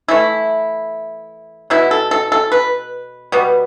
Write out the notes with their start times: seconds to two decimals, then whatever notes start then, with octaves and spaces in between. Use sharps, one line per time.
0.08 E3 A3 E4
1.70 B2 B3 E4
1.91 A4
2.11 A4
2.32 A4
2.52 B4
3.32 B2 G3 B3